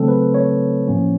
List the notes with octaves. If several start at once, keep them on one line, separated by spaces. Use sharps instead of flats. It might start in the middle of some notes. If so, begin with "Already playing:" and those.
Already playing: C#3 F#3 A3 C4 A4
B4
C#5
A2 F3 A#3 C#4